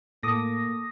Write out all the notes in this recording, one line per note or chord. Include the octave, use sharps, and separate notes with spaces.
A2 A#3 A4 D6 D#6 A#6